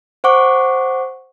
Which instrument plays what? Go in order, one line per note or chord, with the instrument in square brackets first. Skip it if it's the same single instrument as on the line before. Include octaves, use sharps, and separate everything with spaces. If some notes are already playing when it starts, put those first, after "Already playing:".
[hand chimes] C5 F#5 C#6 D6